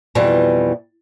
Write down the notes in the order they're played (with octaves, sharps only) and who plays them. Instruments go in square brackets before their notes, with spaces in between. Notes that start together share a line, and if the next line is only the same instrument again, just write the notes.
[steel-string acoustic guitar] F2 B2 E3 G3